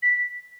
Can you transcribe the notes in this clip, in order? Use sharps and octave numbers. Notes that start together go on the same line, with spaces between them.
B6